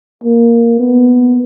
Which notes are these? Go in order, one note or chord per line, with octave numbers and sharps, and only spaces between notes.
A#3
B3